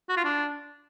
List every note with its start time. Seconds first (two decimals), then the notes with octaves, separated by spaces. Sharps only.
0.09 F#4
0.17 F4
0.25 D4